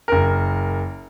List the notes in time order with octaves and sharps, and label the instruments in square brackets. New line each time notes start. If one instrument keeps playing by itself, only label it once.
[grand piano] F#1 A#4